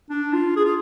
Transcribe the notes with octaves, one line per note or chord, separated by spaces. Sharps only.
D4
F4
G#4
F4